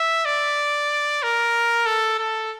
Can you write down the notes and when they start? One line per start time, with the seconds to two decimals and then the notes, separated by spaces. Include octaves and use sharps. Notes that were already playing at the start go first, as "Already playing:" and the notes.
Already playing: E5
0.25 D5
1.23 A#4
1.86 A4
2.19 A4